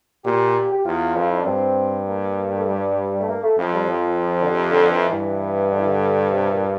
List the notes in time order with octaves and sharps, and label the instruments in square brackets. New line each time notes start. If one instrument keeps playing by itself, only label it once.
[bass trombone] A#2 [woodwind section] G4
[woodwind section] G4
[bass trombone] E2 [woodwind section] F4
[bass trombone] F2 [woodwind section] F4
[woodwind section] E4
D4
[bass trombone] G2 [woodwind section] C4
[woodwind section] A#3
A3
G3
A3
A#3
A3
[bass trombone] F2 [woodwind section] F3
[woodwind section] G3
F3
D3
C3
D3
E3
[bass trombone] G2 [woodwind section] E3
[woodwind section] D3
E3
D3
C3
A#2